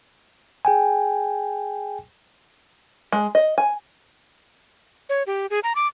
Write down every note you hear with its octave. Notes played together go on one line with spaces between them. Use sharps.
G#4 G5 G#5
G#3
D#5
G#5
C#5
G4
G#4
A#5
D6